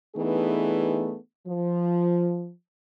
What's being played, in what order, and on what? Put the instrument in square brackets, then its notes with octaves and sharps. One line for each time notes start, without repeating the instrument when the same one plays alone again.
[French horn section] E3 A3 B3 D4 D#4 G#4
F3